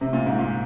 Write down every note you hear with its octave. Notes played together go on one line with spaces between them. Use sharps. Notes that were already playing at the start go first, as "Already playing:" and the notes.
C3
A#2
G#2
A#2